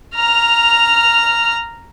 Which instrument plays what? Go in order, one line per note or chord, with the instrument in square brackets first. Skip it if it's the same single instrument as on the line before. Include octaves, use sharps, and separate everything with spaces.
[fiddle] A#5 F6